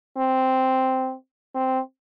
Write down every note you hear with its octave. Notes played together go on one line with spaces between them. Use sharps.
C4
C4